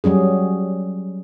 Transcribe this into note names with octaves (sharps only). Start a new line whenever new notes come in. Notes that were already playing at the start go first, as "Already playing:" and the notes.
F#3 G3 C#4 G#4